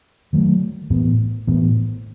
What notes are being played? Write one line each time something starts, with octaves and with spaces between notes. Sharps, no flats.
D#3 F#3 A3
A2 E3 B3
A2 E3 B3